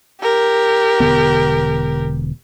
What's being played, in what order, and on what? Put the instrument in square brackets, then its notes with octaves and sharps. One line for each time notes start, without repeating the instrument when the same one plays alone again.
[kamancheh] G4 A#4
[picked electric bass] E1 D3 B3